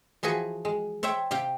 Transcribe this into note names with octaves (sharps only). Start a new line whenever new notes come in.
E3 F3 F#4 G#4 B4
G#3
C5 C#5 E5 G5
C3 G4 F5 G5